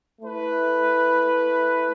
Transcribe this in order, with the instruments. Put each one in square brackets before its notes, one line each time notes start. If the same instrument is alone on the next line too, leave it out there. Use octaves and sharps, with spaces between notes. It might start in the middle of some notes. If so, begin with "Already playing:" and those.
[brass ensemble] A3 E4 B4